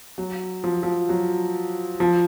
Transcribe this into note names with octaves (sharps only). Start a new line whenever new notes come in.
F#3
F3
F3
F#3
F3